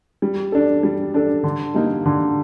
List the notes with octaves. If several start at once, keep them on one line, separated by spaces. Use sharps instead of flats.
G3
D4 A4
G3
D4 A4
D3
G3 A#3 D#4
D3